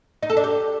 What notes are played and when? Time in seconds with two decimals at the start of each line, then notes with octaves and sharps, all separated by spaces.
0.23 D#4
0.30 A4
0.37 D4
0.44 G4